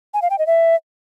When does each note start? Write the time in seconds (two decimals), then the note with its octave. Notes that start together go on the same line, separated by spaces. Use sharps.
0.14 G#5
0.22 F5
0.30 G5
0.38 D#5
0.47 E5